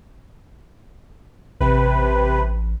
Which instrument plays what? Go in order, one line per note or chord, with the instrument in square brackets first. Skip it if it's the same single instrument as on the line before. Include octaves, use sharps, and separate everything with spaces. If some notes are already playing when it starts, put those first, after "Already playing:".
[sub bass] A1 [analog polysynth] C3 B4